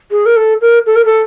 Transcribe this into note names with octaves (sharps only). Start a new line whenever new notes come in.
G#4
A#4
A4
A#4
A4
A#4
A4